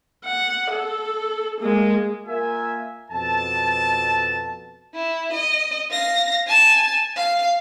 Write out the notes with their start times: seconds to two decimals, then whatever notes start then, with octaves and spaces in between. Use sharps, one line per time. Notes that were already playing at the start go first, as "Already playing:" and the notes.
0.25 F#5
0.71 A4
1.60 G#3 A#3
2.26 A#3 F4 A#4 E5 G#5
3.11 F2 B2 A4 A5
4.95 E4
5.33 D#5
5.91 F5 A#6
6.47 G#5 A5
7.16 F5